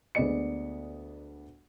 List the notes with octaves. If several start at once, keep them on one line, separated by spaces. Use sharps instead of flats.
D2 G#3 B3 D5 D#5 C#7